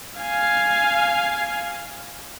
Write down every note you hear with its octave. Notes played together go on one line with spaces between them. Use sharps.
F5 G#5